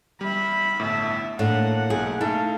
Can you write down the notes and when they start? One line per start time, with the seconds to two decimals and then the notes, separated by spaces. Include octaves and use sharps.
0.21 G3 E5 B5
0.79 G1 A2 E5 A5
1.39 A2 A#3 D4 F#5
1.90 B1 G#4
2.21 A3 D#4 E4 A4 F5